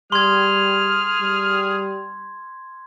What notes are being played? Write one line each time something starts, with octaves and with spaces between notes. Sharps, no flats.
G3 G#4 C6 F6 G#6
G3